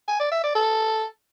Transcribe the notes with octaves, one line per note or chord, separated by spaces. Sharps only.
G#5
D5
E5
D5
A4